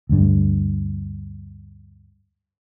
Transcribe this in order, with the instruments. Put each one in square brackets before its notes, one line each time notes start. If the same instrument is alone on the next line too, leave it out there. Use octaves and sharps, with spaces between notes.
[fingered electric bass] D2 G2